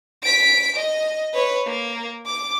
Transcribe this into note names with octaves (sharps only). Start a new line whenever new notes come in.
B6 D7
D#5
B4 C#5
A#3
D6